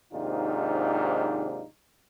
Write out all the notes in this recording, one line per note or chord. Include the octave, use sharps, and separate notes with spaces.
D#2 G#2 C3 D4 D#4 F4